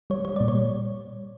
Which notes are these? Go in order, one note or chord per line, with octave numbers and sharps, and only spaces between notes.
G3 C#5
G3 C#5
A#2 D5
C#5
G3